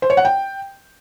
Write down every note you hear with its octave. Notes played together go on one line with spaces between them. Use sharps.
C5
C#5
F#5
G5